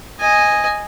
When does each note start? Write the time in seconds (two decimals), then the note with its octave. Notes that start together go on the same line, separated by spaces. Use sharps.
0.20 D#5 G#5